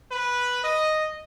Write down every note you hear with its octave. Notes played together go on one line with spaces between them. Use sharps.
B4
D#5